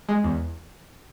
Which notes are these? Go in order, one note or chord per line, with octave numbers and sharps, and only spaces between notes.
G#3
E2